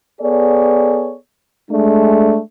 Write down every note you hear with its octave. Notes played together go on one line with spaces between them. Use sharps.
B3 G#4 A4 C#5 D5
G#3 A3 D4